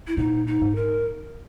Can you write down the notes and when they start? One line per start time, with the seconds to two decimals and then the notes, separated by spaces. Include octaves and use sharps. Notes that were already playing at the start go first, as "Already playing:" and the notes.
0.07 E4
0.17 A#2 D#4
0.47 D#4
0.61 G#2
0.75 A#4